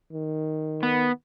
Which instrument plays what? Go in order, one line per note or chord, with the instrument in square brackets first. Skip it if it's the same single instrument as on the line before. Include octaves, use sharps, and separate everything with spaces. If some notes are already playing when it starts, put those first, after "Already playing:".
[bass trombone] D#3
[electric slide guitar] B3